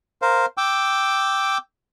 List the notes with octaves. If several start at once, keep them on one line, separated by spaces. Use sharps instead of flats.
A#4 C5 F5
G5 D6 E6